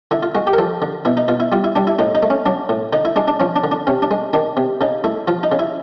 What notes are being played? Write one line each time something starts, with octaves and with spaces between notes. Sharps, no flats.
D3 E4
F4
G#3 F#4
G4
A#4
F3 A4
D3
B2 E4
D#4
B2 F4
E4
G3 F4
E4
G3 D4
E4
A2 D#4
D#4
A3
C#4
F#3 D4
A2
D3 D#4
E4
G#3 D4
D4
F3 C#4
D4
D3
D4
C3 C#4
D4
G#3
D#3 D4
C3
C#3 D#4
A3 E4
F3 F4
D#4
C#3
E4